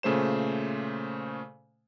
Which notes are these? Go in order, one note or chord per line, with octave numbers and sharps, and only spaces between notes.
A#2 C#3 A3 C5 E7